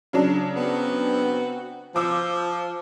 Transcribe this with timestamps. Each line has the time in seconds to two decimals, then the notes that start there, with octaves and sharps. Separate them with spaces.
0.13 C#3 F#3 D4
0.57 B3 C4 F#4
1.96 F3 D6 E6